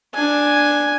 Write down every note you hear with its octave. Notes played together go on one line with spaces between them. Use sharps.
D4 G#5